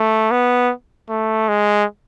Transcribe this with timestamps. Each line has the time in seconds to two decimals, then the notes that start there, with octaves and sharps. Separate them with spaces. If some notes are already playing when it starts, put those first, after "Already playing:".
Already playing: A3
0.31 B3
1.10 A3
1.49 G#3